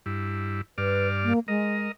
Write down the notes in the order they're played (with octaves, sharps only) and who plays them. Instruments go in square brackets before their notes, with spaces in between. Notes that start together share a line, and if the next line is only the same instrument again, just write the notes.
[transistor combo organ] G2 E4
[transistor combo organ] G2 D5 F6 [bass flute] B4
[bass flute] A#3
[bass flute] G#3 [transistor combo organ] A#4 D#5